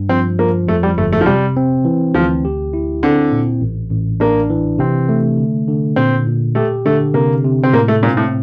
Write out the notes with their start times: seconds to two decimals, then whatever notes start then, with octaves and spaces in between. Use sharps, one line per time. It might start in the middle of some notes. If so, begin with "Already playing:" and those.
Already playing: G2
0.09 F3 C4
0.39 F3 A#3
0.67 F2 A3
0.83 G3
0.97 G1 A3
1.13 A3
1.21 F3
1.26 C3 G3
1.57 C4
1.85 E3
2.15 D2 F3
2.45 G4
2.73 E4
3.03 D3 C4
3.32 A#2
3.61 A1
3.91 A1
4.20 A#3 D4
4.50 E3
4.79 C3 C4
5.09 A3
5.38 D3
5.68 D3
5.96 A#2 C4
6.27 A#2
6.55 A3 G4
6.85 D3 A3
7.14 C3 A#3
7.44 C3
7.63 C4
7.73 A2 A#3
7.88 A3
8.03 A#2 C4
8.17 A2